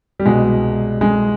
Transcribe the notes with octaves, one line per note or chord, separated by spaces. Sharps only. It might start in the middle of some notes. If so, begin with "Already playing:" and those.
G3
C2 B2 G#3
G#3